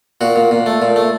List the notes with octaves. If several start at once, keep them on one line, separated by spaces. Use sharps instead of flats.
A#2 F#4
A#2
A#2
A3
A#2
A3